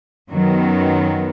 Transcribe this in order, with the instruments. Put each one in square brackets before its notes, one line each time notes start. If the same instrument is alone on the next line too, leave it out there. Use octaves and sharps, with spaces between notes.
[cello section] F#2 D#3 F#3 B3